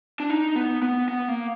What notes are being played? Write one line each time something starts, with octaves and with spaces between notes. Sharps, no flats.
D4
D#4
B3
B3
B3
A#3